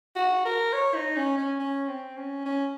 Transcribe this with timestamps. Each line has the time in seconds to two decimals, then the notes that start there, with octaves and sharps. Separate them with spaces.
0.16 F#4
0.45 A#4
0.73 C#5
0.95 D#4
1.16 C#4
1.38 C#4
1.59 C#4
1.88 C4
2.17 C#4
2.45 C#4